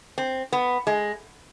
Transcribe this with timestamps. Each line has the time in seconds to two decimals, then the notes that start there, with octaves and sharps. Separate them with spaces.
0.18 C4
0.53 B3
0.87 G#3